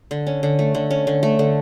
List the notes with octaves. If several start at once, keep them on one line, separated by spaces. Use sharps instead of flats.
D3
C#4
D3
A3
D3
C#4
D3
A3
D3